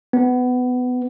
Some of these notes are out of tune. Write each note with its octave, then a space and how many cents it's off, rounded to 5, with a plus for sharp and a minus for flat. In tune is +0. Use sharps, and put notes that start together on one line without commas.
B3 +20